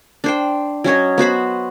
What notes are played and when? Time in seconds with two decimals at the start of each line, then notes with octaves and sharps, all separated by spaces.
0.24 D4 C5 G5
0.84 F#3 C#4 C#5 D#5
1.18 B3 F#4 C5 B5